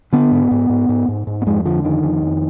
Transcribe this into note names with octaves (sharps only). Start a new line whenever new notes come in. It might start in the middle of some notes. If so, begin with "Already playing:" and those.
D3 B3
G#2
G#2
G#2
G#2
G#2
G#2
B3
F2 G#3
D3 F3
F2 D#3
F2
F2